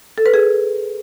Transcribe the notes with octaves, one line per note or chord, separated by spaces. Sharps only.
A4
B4
G#4